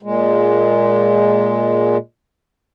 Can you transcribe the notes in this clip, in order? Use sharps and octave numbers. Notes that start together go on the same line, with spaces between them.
A#2 G#3